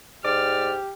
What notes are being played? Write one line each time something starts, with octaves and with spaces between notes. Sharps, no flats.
G#2 G4 D5 F6